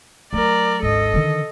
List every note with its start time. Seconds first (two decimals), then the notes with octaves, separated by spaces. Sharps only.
0.33 F#3 A3 A#4 D5
0.82 G#1 D2 A4 D#5
1.14 D3 D#3